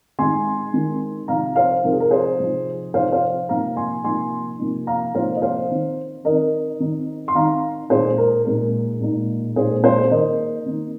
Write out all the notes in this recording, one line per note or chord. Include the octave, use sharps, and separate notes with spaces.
D#3 G#3 C4 D#4 G#5 C6
D#3 G#3 C4 D#4
C3 F3 C4 D#4 F5 A#5
C5 F5
C3 F3 C4 D#4 A#4
G#4
A#4
G#4 C5
C3 F3 C4 D#4
C3 F3 C4 D#4 C5 F5
C5 F5
C3 F3 A#3 D#4 F5 A#5
G#5 C6
C3 F3 A#3 D#4 G#5 C6
C3 F3 A#3 D#4
F5 A#5
C3 F3 A#3 D#4 C5 F5
D#5
C5 F5
D#3 C4 D#4
D#3 C4 D#4 A#4 D#5
D#3 C4 D#4
C6
D#3 C4 D#4 F5 A#5
A#2 G#3 D#4 G#4 C5
A#4
A#2 G#3 D#4 A#4
A#2 G#3 D#4
A#2 G#3 D#4 G#4 C5
G#4 C5
D#3 A#3 D#4 A#4 D#5
D#3 A#3 D#4